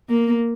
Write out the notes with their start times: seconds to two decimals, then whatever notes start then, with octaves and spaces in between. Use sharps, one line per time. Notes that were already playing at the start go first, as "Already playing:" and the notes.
0.09 A#3